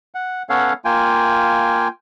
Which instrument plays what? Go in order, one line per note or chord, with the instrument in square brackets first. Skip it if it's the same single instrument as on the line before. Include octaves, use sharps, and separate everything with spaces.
[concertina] F#5
B3 C#4 A4 C#5 F5 F#5
A#3 F4 G5 G#5